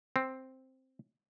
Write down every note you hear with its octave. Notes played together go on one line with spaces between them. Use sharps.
C4